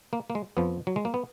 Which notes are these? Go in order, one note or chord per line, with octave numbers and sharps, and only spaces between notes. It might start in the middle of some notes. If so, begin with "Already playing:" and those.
A#3
A#3
G#3
F2 F3 B3
F#3
G#3
A#3
B3